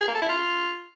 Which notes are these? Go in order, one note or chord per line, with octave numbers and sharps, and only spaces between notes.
G#4
A#3
A4
E4
F4